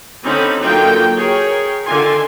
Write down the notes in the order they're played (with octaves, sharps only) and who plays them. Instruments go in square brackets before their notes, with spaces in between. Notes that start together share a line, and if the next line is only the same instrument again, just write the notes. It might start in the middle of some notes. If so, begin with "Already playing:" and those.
[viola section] D3 C4 C#4 D#4 B5
D3 F#3 A#3 D#4 F4 G5
G#4 A#4 C#5 G5
D3 D#3 F4 G#5 C6